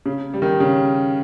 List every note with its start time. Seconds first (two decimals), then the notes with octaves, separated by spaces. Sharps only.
0.06 C#3
0.34 G3
0.42 D#3
0.60 C#3